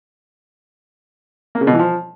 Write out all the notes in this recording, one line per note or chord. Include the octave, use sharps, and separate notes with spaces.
A#3
C#3
B2
E3
F3